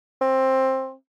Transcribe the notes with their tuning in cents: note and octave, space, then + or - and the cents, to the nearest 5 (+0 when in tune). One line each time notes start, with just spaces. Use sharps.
C4 +15